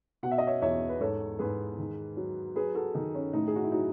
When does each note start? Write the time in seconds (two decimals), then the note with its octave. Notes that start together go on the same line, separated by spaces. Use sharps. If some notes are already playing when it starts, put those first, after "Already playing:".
0.23 B2 F#5
0.31 E5
0.38 D#5
0.47 C#5 E5
0.62 E2 C#5 E5
0.89 B4
1.00 G#2 A4 C#5
1.39 G#2 G#4 B4
1.78 D#3
2.17 F#3
2.56 F#3 G#4 B4
2.75 F#4 A4
2.94 D#3 D#4
3.15 C#4
3.33 A2 D#4
3.48 G#4
3.56 F#4
3.64 E4
3.72 F#3 D#4